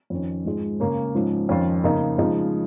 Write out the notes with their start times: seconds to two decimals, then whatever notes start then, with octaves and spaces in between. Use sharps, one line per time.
0.10 F2 D#3 C#4
0.45 G#2 F3 G#3
0.80 C#3 A#3 C#4
1.14 G#2 F3 C#4
1.49 F2 D#3 C#4 F4
1.84 C#3 A#3 D#4
2.18 C#3 F3 G#3 D#4